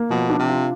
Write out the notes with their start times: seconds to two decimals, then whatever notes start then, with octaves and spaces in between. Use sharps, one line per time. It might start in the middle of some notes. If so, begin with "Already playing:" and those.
Already playing: A#3
0.10 B2 F3
0.30 D4
0.39 C3
0.49 F4